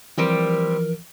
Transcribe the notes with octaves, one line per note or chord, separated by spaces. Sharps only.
E3 F3 G3 C4 G4 A#4